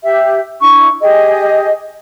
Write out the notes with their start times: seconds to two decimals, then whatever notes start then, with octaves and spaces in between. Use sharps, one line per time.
0.03 G4 E5
0.61 D4 E4 C#6
1.01 G4 G#4 D#5